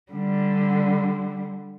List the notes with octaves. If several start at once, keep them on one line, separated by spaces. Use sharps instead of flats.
D3 G3